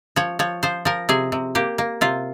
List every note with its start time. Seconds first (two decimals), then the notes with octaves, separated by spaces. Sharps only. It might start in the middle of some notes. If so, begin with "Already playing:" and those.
0.16 F3 C#5
0.39 F3 C#5
0.63 F3 C5
0.85 F3 A#4
1.09 C3 G#4
1.32 C3
1.55 A#3 G4
1.78 A#3
2.01 C3 F4